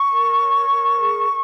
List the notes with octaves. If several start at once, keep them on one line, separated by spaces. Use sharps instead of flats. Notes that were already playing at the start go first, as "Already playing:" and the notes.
Already playing: C#6
A#4
C#5
A#4
G#4